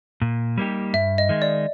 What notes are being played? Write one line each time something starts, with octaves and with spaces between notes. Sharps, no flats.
A#2
G3 A#3 D#4 G4
G2 E5
D#5
D#3 G#3
D5